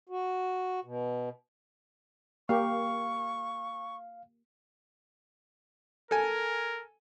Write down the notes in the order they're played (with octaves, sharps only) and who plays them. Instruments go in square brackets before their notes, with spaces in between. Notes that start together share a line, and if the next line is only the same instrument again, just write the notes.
[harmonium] F#4
B2
[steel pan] A#3 G4 [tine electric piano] F5 [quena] C#6
[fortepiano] A4 G#5 [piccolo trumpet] A#4